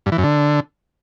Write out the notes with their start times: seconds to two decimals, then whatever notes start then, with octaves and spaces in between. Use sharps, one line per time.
0.06 G2
0.12 E3
0.18 F#2
0.24 D3